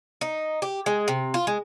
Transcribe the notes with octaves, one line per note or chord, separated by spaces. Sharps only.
D#4
G4
G#3
C3
F4
G#3